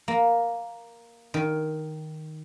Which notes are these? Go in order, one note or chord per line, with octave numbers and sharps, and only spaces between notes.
A#3
D#3